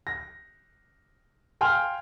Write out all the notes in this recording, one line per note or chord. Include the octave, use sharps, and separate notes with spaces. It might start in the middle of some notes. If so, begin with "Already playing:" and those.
A#6
F5 G5 G#5 C6 F6